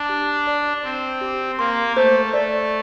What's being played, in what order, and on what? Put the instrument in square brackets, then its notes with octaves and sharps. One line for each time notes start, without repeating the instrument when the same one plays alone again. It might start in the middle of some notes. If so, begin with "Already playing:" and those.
Already playing: [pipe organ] D4
[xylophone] G4
D5
[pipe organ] C4 [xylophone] C6
[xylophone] G4
[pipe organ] A#3 [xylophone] C6
[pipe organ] A3 [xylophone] C5
[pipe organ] A3 [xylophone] D5